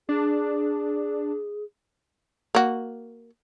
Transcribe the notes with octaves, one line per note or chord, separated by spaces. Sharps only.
D4 G#4
A#3 F#4